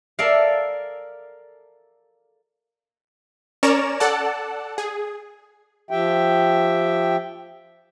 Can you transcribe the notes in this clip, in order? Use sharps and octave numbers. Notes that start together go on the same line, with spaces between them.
A4 A#4 D5 E5 F5
C#4 A#4 C#5 D5 A#5 E7
A4 D5 F#5 A5
G#4
F3 G4 E5 G5